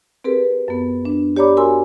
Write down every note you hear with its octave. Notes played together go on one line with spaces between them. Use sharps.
C4 G4 G#4 A#4 B4
F#2 B3
D4
G4 C#5 D5 A#5 B5 D6
F#4 A#4 G#5 A#5 C6 E6